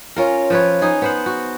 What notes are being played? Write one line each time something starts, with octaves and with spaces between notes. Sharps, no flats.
C#4 F4 A#4
F3 B4 C#5
D#4 G#4
B3 C5 F#5
F#4